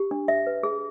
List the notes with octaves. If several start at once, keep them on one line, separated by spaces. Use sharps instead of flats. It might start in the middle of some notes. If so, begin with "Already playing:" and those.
Already playing: G4
D4
E5
B4
G#4